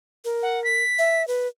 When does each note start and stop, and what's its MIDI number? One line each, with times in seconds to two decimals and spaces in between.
0.25 0.83 70
0.43 0.62 78
0.64 1.22 95
0.98 1.27 76
1.27 1.47 71